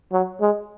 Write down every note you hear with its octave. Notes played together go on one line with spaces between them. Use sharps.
F#3
G#3